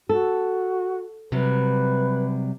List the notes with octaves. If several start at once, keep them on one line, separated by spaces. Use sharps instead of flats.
F#4 A4
C3 F#3 G3 B4